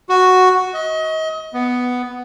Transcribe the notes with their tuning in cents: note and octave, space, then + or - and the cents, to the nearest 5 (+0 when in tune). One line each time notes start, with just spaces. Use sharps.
F#4 +0
D#5 +30
B3 +5